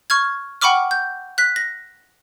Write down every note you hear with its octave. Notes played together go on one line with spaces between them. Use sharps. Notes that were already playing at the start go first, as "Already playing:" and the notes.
C#6 F6 G#6
F#5 G5 B5 C#6 D6 F6
G6
F#6 B6
A#6